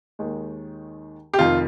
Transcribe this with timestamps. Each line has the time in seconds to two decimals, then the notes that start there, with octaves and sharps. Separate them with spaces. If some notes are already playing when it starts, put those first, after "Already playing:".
0.19 D#2 D#3 G#3
1.34 G4
1.39 F1 F2 D#3 F4